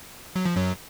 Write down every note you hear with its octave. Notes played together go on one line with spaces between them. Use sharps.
F#3
F3
F#2 F#3